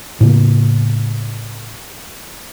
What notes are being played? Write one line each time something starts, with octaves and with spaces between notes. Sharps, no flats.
A2 C#3 A#3